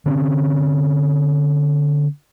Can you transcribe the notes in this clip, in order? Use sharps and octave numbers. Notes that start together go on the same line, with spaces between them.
D3 C4 C#4